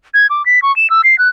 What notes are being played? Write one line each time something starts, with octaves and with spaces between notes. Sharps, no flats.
G#6
D6
B6
C#6
E7
E6
C7
F#6